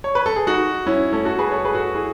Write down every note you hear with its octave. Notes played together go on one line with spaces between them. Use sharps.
C#5
B4
A4
G#4
D#4 F#4
C#4 E4
A3 C#4
F#4 A4
G#4 B4
A4 C#5
G#4 B4
F#4 A4
E4 G#4